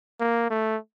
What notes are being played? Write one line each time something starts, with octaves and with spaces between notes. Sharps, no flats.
A#3
A3